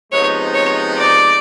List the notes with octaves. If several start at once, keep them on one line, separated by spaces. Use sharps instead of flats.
C3 F3 G#3 B3 D#4 C#5
C#5
D5